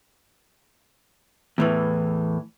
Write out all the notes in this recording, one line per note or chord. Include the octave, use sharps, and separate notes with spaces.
E2 A2 E3